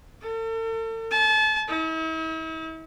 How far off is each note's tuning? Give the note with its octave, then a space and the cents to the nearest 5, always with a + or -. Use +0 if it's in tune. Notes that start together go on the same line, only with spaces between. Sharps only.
A4 +40
A5 -35
E4 -45